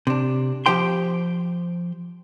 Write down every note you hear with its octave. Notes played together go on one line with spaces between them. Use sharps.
C3 D4
F3 G4 C5 G5 C6